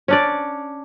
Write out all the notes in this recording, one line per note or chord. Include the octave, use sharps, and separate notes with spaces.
C#4 D4 D5